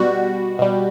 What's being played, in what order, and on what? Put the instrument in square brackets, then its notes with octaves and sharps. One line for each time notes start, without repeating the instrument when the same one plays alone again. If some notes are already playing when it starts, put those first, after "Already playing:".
Already playing: [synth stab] B2 G3 F#4
B2 G3